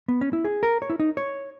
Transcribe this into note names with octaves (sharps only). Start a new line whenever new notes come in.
B3
C#4
E4
G#4
A#4
C#5
E4
D#4
C#5